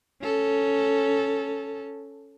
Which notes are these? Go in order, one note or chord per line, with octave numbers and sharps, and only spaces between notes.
C#4 A4